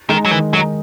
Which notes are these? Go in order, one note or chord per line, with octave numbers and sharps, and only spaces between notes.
D#3 G#3 D#4
F#3
D#3 E3
F#3 G#3 D#4